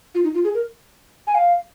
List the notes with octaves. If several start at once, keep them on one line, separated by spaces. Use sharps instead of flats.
F4
D#4
F4
G#4
A#4
G#5
F5